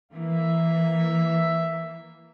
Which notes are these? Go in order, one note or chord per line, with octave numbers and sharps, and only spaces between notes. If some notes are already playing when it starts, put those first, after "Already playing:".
E3 A#3 E5